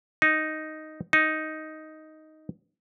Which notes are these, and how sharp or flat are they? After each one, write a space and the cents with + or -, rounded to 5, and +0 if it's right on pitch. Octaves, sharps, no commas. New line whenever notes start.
D#4 +0
D#4 +5